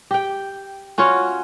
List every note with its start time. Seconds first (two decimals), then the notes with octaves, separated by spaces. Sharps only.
0.11 G4 G5
0.98 C#4 F4 F#4 C#5